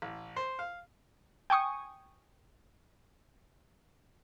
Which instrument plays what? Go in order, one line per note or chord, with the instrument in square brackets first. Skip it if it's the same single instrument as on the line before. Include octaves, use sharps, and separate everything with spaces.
[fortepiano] A1
C5
F5
[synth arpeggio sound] G5 G#5 C#6 D#6